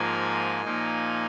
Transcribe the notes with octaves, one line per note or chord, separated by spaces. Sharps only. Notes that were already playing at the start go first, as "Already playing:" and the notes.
Already playing: G#2 F3 A#3 G#5
A#2 F3 A#3 D#4